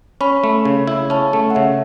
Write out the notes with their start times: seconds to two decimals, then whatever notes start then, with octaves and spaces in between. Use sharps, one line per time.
0.21 C#4 B5
0.44 A3
0.65 C#3
0.88 E4
1.10 C#4 A5
1.33 A3
1.50 F#5
1.55 C#3 E5